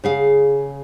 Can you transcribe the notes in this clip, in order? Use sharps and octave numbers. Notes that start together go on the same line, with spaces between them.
C#3 G#4 F5